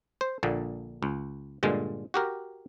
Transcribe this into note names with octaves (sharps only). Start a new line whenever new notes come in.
C5
A#1 A#2 D3
C#2
G2 A#2 D3 G#3
F#4 G4 A#4